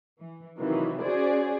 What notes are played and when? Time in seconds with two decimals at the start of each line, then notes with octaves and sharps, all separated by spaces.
0.20 E3
0.59 C3 D#3 E3 F#3 A#3
1.01 C#4 F#4 G#4 C5 D5